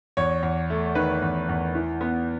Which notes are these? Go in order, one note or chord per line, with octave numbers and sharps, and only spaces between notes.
E2 C#5
E2
A3
D#3 B4
E2
E2
E3
B3